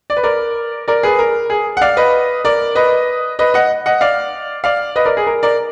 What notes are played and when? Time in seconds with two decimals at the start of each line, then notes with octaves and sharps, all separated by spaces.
0.10 D5
0.17 B4
0.23 A#4 D5
0.88 A#4 D5
1.03 G#4 B4
1.19 A#4
1.50 G#4
1.77 F#5
1.81 D5 F5
1.97 B4 D#5
2.45 A#4 D5
2.75 B4 D#5
3.39 B4 D#5
3.54 D#5 F#5
3.86 D#5 F#5
4.01 D5 F5
4.64 D5 F5
4.96 B4 D#5
5.06 A#4 D5
5.17 G#4
5.27 A#4
5.43 A#4 D5